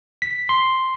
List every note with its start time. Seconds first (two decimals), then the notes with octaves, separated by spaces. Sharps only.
0.22 B6
0.49 C6